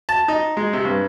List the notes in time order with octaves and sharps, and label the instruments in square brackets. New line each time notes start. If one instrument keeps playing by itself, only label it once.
[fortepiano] A5
D#4
G#3
C3
G2